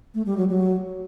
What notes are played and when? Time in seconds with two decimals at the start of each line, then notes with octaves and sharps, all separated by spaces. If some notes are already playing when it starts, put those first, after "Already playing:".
0.14 A3
0.26 G3
0.37 F#3
0.49 F#3